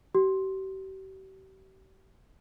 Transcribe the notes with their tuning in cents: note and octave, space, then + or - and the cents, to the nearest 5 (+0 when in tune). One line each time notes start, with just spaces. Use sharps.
G4 -40